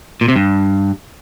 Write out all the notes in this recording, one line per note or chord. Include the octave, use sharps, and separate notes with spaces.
A#2
C3
G2